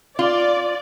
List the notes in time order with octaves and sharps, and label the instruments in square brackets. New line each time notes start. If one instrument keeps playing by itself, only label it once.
[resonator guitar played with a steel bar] F4 [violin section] D5